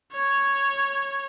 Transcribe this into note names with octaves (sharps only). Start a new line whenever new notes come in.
C#5